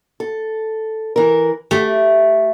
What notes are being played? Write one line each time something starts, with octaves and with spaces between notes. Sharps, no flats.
A4
E3 A#4
A3 G4